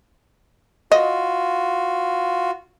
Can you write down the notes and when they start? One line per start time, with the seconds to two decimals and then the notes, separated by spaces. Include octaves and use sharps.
0.92 F4 F#4 D#5